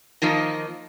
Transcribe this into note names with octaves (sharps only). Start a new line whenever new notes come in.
D#3 F3 A#3 D#4